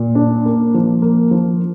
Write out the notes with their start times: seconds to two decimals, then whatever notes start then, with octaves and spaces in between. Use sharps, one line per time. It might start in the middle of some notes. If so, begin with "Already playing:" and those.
Already playing: A#2
0.15 D4
0.45 A#3
0.74 F3
1.02 A#3
1.31 F3